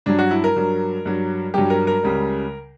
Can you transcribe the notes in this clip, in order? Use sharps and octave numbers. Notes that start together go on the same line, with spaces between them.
G2 F#3 D4
F#4
E4
A#4
G2 F#3
G2 F#3
G2 F#3 G4
A#4
A#4
C#2 C#3 G3